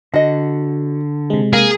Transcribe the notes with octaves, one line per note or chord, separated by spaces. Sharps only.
D3 F#4 D#5
C3 G#3
A#3 G#4